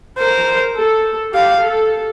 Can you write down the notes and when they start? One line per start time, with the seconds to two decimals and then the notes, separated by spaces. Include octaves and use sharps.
0.18 A#4 C5
0.76 A4
1.34 G4 F5
1.63 A4